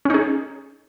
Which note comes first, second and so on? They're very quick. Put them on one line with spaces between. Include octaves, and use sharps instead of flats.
C#4 D#4 G#4